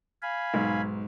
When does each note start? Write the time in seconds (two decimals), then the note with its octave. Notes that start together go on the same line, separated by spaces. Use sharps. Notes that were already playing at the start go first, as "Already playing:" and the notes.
0.22 F5 G#5 B5
0.54 B1 G#2